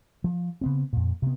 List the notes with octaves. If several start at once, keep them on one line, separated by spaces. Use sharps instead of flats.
F3
C#3 B3 C4
F2 A#2
C3 B3